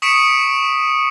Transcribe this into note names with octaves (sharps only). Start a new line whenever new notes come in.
C#6 D#6 B6 C#7 D7 E7